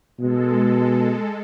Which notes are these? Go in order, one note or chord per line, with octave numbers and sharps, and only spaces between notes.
B2 G#3 A4